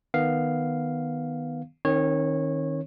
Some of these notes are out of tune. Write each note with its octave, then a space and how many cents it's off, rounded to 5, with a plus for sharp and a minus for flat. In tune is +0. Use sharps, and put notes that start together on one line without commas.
D#3 +0 B3 +0 F5 +0
D#3 +0 C4 +40 C#5 -20